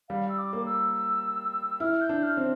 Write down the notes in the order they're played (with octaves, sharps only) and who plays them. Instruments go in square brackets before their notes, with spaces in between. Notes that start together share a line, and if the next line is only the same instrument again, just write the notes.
[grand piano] G3 [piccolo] F5
[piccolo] E6
D6
[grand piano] A#3
[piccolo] E6
[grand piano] E4 [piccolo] F6
[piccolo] G6
[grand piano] D4
[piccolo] F6
[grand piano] C4